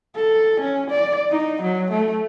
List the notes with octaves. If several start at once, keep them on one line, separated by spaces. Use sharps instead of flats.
A4
C#4
D5
D#4
F#3
A3